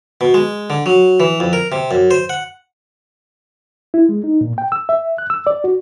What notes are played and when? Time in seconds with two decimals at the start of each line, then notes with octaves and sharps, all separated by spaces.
0.21 B2
0.34 G#3
0.70 D3
0.86 F#3
1.20 E3
1.40 F2
1.53 A#4
1.72 C3
1.91 F#2
2.11 C5
2.29 F#5
3.94 E4
4.09 G#3
4.24 D#4
4.41 A#2
4.58 G5
4.72 E6
4.89 E5
5.18 F#6
5.30 E6
5.47 D5
5.64 F#4